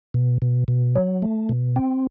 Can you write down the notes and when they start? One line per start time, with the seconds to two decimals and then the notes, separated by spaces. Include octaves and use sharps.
0.14 B2
0.42 B2
0.68 B2
0.96 F#3
1.22 A3
1.49 B2
1.76 C4